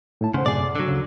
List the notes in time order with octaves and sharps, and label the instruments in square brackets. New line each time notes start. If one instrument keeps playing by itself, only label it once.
[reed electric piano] A2 E4 A5
[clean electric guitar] C#3 [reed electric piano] C5 F#5 C6
[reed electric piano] F#2 A2 C3 [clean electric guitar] G#4 D5
[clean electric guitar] D3 F#3
[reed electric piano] D2 C#3